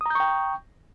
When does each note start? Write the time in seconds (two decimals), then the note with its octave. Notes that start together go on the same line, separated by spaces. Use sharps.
0.01 D#6
0.06 A#5
0.10 G6
0.15 C#6
0.20 G5